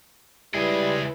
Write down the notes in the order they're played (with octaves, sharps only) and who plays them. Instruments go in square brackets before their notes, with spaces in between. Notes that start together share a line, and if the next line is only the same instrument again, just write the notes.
[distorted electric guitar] C#2 G#4 [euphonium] G3 [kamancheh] E4 B4